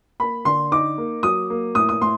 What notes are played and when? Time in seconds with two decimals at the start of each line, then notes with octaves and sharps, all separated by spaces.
0.20 A#3 B5
0.45 D3 C6
0.72 D#4 D6
0.98 A#3
1.23 F#3 D#6
1.50 A#3
1.75 A2 D#6
1.89 D#6
2.01 A2 C6